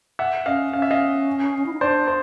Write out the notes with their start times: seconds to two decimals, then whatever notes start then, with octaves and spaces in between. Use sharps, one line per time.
0.19 E5 F#5
0.46 C#4 D#5 F5
0.73 C#4 F5
0.82 E5
0.91 D#5 F5
1.66 E4
1.73 D#4
1.80 D4 C5 D5
2.08 C5